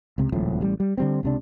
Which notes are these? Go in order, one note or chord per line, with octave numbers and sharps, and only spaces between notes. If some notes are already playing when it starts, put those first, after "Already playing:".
C#2 C3
D#1 C#2 A2 F3
A1 G3
G3
D3 G3 C4
C#2 C3 D4